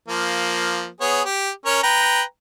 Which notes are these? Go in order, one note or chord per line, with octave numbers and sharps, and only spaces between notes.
F3 A#3
B3 G#4 C#5
G4
C#4 A#4 C#5
B4 G5 A#5